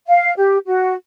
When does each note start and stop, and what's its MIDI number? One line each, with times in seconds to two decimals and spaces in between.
0.08 0.32 77
0.37 0.58 67
0.66 0.94 66